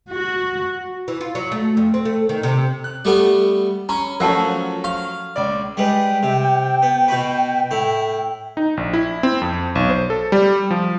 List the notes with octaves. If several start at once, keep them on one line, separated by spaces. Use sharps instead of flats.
F#4
E3
F4
F#3
A3
F2
C4
A3
D#3
C3
F#6
G3 A3 B3
C#4 A#5 B5
F3 F#3 A3 C#4 A#4 F#5 A5
F5 C#6
C#2 D5
G3 G#3 B4 G5
C3
B3
B2 F#4 B4
A2 E4
D#4
A#1
E4
C4
F2
B1
C5
A4
G3
F3